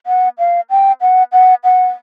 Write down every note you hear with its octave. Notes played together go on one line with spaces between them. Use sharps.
F#5
F5
G5
F#5
F#5
F#5